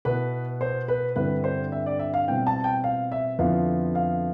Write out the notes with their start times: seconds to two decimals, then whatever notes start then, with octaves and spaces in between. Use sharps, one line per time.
0.05 B2 B3 E4 B4
0.61 C5
0.88 B4
1.16 G2 D3 G3 C4 E4 B4
1.44 C5
1.72 E5
1.86 D5
1.99 E5
2.14 F5
2.27 B2 G3 C4 E4 G5
2.47 A5
2.64 G5
2.84 F5
3.12 E5
3.39 F2 D3 F3 B3 E4 F5
3.95 F5